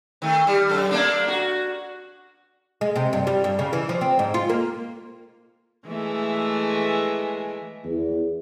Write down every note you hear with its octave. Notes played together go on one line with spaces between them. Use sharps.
D#3 A3
G3
F#2 A4
A3 A#3 D4
F#4
G#3
C3
G2
G3
G2
C#3
E3
F3
C4
G#2
F4
A#3
E3 G#3 A3
E2